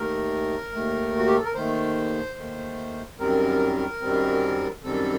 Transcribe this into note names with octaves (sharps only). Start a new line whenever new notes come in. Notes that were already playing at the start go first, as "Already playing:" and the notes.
Already playing: D#2 D#3 A3 A#4
D#2 D#3 A3
F#4
G4
A4
A#4
D#2 D#3 A3 C5
D#2 D#3 A3
F#2 D#3 G3 C4 A#4
F#2 D#3 G3 C4
F#2 D#3 G3 C4 A4